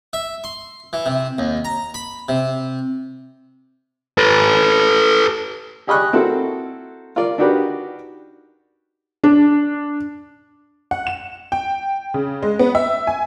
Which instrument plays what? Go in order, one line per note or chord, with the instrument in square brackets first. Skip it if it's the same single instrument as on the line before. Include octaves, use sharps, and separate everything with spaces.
[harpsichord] E5
C6
E3
C3
D#2
A#5
B5
C3
[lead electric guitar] A4 B4
[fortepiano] G4 G#4 D#5 B5 C#6 F#6
C4 E4 F#4 A4 A#4
F4 A#4 D5
D4 D#4 F#4 G4 A#4 B4
[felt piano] D4
[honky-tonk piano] F#5
E7
G5
C#3
G#3
B3
E5
G#5